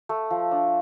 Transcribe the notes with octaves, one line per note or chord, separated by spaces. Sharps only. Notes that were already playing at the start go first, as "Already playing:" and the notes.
A3
F3
D4